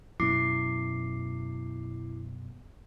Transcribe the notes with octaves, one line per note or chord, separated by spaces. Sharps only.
F#2 B2 E4 D6 C7